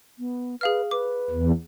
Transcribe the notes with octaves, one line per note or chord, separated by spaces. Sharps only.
B3
G#4 B4 F5 F6
B4 D6
E2